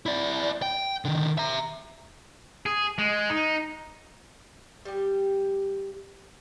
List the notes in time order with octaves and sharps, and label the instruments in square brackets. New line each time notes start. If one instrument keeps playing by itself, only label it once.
[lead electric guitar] E4 D5
G5
D3 D#3
E5 A#5
[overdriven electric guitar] G#4
G#3
D#4
[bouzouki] G3 G4